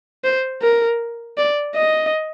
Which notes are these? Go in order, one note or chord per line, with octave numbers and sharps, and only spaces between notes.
C5
A#4
D5
D#5